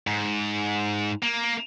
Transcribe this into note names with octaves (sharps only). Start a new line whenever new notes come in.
G#2
A#3